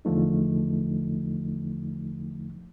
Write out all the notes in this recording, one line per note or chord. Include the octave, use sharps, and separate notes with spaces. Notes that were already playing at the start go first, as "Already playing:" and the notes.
E2 D3 F3 A3 D#4